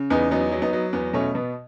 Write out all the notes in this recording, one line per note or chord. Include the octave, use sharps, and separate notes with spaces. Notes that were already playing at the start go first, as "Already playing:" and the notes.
Already playing: C#3
E2 B3 D#4
F#3 B3 D#4
F#3
B3 D#4
F#3
E2 B3
B2 A3 C#4
B2 B3